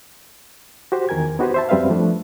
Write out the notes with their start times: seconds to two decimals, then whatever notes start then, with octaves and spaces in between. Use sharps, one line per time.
0.92 F#4 G4 C5
1.09 E2 D#3 A#4 G#5 G#6
1.39 B3 D#4 F#4 G4 B4 C5
1.54 C5 E5 A5
1.69 F#2 G3 C4 B4 E5 F5
1.90 F3 A3 D4